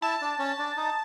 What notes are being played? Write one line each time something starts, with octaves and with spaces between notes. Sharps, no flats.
E4 A5
D4
C#4
D4
D#4